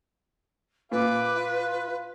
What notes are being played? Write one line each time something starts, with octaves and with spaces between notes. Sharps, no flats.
A#2 B4 F5 D6
F4